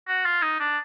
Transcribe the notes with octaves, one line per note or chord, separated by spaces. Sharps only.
F#4
F4
D#4
D4